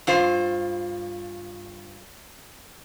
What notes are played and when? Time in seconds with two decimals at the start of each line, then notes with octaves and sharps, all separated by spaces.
0.07 G2 F4 C5